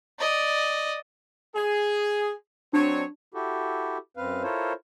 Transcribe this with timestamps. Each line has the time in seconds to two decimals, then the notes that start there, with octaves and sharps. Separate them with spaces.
0.19 D5 D#5
1.55 G#4
2.73 F#3 C4 D4 C#5
3.34 E4 F#4 G4 A4
4.17 F#2 C4 B4 F5
4.43 E4 F4 A4 A#4 C5 C#5